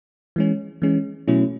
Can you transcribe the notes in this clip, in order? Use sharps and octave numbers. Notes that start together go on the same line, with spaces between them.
E3 G#3 C#4
E3 G#3 C#4
B2 F#3 A3 C#4 E4